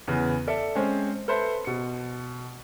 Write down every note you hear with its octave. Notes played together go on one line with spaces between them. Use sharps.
E2 C#3 B3
A4 D5 E5
G#3 C4 C#4 C5
A4 B4 C5 E5 B5
B2 C#7